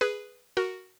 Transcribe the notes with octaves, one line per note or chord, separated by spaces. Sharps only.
G#4 B4
F#4 A#4